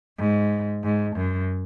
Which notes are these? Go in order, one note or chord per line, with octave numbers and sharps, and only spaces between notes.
G#2
G#2
F#2